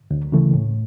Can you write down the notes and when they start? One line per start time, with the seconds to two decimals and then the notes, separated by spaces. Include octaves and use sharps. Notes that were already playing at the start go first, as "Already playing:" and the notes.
0.11 D2
0.32 C#3 E3 A3
0.53 A2